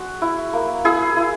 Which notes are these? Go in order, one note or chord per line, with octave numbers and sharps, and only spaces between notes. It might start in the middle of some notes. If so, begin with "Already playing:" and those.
Already playing: G#3 F#4
E4
A#3
E4 G#4
E4